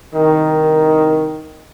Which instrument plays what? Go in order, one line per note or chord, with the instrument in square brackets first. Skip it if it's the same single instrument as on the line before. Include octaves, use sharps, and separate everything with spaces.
[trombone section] C2 D#3